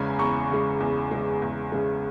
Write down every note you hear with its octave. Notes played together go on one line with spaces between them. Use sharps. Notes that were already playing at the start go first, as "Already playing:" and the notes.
Already playing: E2 C#3 G#3 G#5 A#5 B5
E2 A#5 C#6
C#3 G#3
E2
C#3 G#3
E2
C#3 G#3